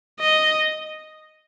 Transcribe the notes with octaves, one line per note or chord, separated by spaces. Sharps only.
D#5